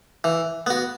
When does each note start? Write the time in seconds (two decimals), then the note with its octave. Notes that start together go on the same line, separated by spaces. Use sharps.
0.24 E3
0.67 B3 F#4